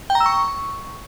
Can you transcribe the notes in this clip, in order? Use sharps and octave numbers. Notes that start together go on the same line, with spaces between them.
G5
A#5
E6
C#6